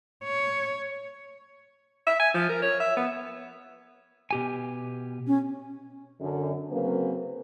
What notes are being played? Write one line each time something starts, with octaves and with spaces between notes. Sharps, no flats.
C#5
E5
G#5
F3
A#4
C#5
E5
B3
B2 G4 G#5
C#4
F#2 D3
C#3 F#3 A#3 C4 B4